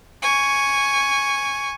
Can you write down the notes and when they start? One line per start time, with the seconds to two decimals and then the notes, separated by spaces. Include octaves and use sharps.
0.22 G#5 C#6